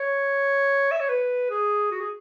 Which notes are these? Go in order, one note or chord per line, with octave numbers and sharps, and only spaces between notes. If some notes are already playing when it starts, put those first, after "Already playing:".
Already playing: C#5
E5
C#5
B4
G#4
F#4
G#4